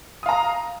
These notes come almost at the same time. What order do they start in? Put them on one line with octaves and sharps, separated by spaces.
D#6 F5 A#5